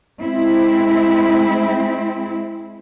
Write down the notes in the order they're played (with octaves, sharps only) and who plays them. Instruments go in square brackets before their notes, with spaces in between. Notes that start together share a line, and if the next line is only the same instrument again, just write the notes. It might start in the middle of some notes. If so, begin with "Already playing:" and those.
[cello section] G#3 C4 E4